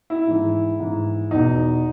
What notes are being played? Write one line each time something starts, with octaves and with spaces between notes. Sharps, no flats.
E4
G#2 E3
G#2 E3
E2 B2 D#4